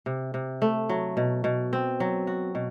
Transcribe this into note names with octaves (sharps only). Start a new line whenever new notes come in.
C3
C3
A3
F#3
B2
B2
C4
F#3
F#4
B2